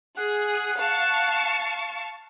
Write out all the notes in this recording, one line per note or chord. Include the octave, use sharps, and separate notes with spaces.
G#4 F#5
F5 A5 C#6